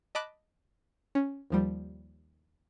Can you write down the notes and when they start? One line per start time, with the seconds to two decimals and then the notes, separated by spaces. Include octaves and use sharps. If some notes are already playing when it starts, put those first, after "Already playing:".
0.15 D#5 A5 B5 D6 F#6
1.15 C#4
1.50 D#2 F3 G3